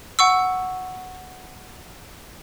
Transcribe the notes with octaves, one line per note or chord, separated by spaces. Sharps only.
F#5 C#6 E6